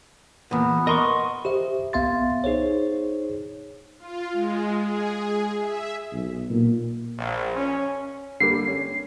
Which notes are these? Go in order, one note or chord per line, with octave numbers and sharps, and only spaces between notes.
E2 A#2 B3
A#4 D#5 C6 C#6
G4 C5 E5
C2 B3 E5 F5 C6 A6
D#4 G#4 C5 C#5
F4
G#3
G#4
E5
B1
A#2
A#1
C#4
D3 G3 A#3 C7
C#4